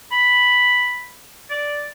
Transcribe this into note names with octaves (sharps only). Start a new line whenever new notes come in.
B5
D5